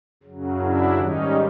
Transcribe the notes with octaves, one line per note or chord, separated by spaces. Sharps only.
F#2 C#3 F#3
D4 E4
G#2 D#3 G3 C#4 D#4